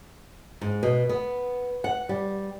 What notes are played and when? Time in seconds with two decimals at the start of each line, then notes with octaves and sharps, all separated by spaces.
0.61 G#2
0.83 B2
1.09 B3
1.84 F#5
2.09 G3